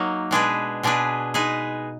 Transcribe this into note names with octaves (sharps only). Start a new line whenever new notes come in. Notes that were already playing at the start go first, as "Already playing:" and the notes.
Already playing: F#3 A#3 D#4
B2 G#3 D4 G#4 B4
B2 G#3 D4 G#4 B4
G#3 D#4 G#4 B4